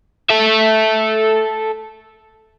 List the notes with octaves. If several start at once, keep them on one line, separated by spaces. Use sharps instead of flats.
A4 E5